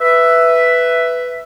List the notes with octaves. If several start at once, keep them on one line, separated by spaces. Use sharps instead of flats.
B4 E5